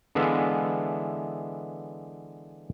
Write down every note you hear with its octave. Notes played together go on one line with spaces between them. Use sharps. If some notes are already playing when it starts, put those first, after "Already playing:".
D3 E3 G#3 B3 E5 F5